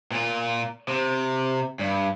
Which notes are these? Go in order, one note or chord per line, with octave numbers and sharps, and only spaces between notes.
A#2 F4
C3
G2